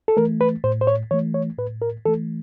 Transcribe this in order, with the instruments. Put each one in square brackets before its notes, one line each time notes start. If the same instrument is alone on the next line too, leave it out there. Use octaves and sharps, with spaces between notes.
[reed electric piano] A4
E3 A3 A#4
B4
A2 C5
C5
C#5
E3 A3 C#5
C#5
A2 B4
A#4
E3 A4
A3